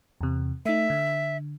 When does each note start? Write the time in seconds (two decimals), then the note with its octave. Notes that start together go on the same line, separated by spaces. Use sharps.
0.21 E2 C3
0.66 A3 D#4 E5
0.90 D3